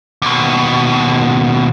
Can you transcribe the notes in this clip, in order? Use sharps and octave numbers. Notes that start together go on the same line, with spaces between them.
D#2 B2